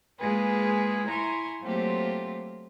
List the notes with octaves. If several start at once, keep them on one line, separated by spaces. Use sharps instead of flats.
G#3 A#3 F4 G#4 B4
E4 G#5 A#5 C6 C#6
F#3 A3 A#3 C4 F4 G4